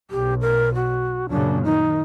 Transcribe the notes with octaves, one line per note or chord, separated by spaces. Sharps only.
B1 G4
A#4
F#4
F#2 A#2 C#3 D4
D#3 D#4